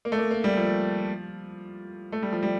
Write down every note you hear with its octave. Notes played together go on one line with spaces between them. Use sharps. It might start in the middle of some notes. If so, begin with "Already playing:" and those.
A#3
A3
A#3
A#3
G3
F3
A3
G3
F3
G3